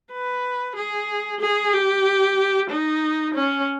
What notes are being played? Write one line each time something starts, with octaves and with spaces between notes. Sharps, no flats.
B4
G#4
G#4
G4
D#4
C#4